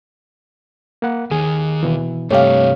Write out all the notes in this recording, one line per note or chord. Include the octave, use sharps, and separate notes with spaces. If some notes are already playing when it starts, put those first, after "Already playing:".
A#3 F#5
D#2 D#3 G#4
B2 E3
G2 C3 A3 G4 C#5 F5